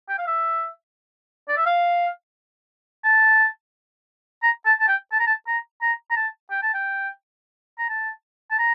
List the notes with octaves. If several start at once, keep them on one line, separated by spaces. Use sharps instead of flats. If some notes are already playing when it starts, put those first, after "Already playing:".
G5
F5
E5
D5
E5
F5
A5
A#5
A5
A5
G5
A5
A#5
A5
A#5
A#5
A#5
A5
G5
A5
G5
A#5
A5
A5
A#5